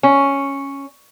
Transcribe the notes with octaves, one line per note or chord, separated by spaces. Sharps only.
C#4